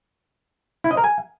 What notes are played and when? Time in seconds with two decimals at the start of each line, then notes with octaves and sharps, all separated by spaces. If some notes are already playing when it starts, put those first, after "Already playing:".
0.84 E4
0.91 D#5
0.97 A#4
1.04 G#5